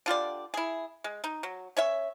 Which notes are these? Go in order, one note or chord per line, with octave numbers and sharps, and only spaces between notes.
D3 F4 G4 D5
E4 G#4
G#3
D#4
F#3
C#4 C#5 E5